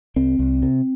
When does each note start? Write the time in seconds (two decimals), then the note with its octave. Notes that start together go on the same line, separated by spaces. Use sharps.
0.16 C2 C4
0.39 C2
0.62 C3